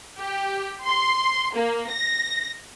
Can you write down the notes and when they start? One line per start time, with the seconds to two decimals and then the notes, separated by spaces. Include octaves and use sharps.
0.17 G4
0.84 C6
1.53 A#3
1.89 A#6